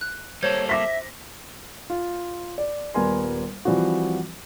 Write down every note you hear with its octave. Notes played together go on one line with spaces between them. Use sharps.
F#6
G3 A#3 A4 C5 C#5 G6 G#6
E5 D6 A#6 B6
F4
D5
D#1 G3 B3 A#4 G#5 C6
E3 F3 G3 C4 F#4